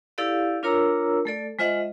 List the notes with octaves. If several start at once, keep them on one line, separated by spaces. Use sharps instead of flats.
E4 G4 A4 D5 F5
D4 F4 A#4 C#5 A#5 E6
A3 A4 D5
G#3 F4 C5 D#5 E5 F#5